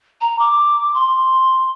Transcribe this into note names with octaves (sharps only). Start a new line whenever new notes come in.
A#5
D6
C6